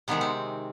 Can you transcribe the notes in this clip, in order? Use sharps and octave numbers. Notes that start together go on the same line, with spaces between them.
C3 D#3 G#3 B3
C4